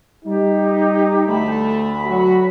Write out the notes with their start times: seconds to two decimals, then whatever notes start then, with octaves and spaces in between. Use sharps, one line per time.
0.25 G3 D#4 G4
1.28 D2 A3 B5
2.06 F#3 F#4